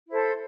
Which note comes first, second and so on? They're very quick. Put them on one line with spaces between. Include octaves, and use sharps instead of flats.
E4 C5 A4